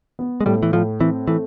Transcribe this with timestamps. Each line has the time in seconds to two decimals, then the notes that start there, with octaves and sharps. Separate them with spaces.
0.19 B3
0.41 G#3
0.46 A2 G3
0.63 E3
0.73 A2 F3
1.00 E3 C4
1.28 E3 A3